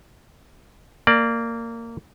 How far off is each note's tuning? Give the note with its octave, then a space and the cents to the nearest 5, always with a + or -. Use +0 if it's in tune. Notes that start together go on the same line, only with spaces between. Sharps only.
A#3 -15 D5 +10